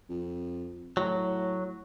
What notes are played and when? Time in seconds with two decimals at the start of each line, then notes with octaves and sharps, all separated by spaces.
0.10 F2
0.97 A2 F#3